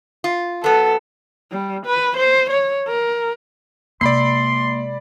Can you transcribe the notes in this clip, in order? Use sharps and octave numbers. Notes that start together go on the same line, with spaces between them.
F4
F#3 B3 A4
G3
B4
C5
C#5
A#4
C3 G#3 A#3 D5 B5 C6 C7